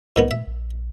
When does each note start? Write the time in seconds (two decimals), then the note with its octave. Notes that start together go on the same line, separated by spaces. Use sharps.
0.16 C2 G#2 D#3 B3
0.31 A#2 E5
0.47 A#1